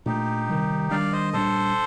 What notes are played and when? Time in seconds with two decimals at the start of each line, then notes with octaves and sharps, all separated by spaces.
0.06 A#2 A3 D4 D#4 G4
0.49 C3 D#3 G3
0.90 D#3 G3 D4 D5 F5
1.12 C5 D#5
1.33 A#2 G3 D4 A4 C5